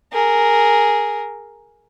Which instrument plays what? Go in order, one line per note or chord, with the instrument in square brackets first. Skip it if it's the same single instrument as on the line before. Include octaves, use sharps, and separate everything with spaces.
[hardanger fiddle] G#4 A#4